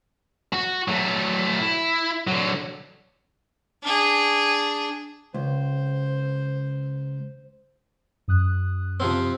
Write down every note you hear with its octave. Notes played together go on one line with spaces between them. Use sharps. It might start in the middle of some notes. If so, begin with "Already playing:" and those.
F#4
F#3 A3
E4
D3 F#3
D4 G#4
C#2 C5
F#2 D#6 F#6
C3 F3 C4